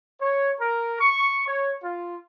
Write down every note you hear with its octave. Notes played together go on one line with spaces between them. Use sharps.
C#5
A#4
C#6
C#5
F4